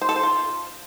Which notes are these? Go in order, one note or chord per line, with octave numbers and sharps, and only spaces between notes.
C5
A4
C5
F4